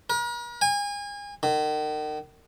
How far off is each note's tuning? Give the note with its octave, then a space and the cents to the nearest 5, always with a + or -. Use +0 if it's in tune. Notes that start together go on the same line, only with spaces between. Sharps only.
A#4 +45
G#5 -30
D#3 -35